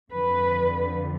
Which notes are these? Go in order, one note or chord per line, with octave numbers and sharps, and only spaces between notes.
F2 D3 F3 B4